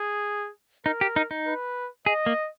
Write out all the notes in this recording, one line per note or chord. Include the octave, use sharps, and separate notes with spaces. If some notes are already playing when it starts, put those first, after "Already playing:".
Already playing: G#4
D#4 A#4
G4
D#4
D#4
B4
G#4 D#5
A#3